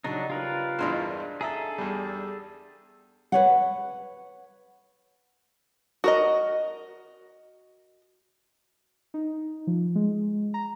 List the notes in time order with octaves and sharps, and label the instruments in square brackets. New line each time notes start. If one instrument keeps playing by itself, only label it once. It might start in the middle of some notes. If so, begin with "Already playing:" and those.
[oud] C#3 G3 [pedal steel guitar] F#3 D4 D#4
[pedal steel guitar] F4 A#4 B4
[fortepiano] E2 G2 E3 [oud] D4 D#4 C5
[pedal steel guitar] G#4 A4 [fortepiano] E5 A#5
[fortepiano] E2 G3
[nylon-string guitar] B4 C#5 F#5
[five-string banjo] F#4 A#4 D#5
[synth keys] D#4
F3
G#3
A#5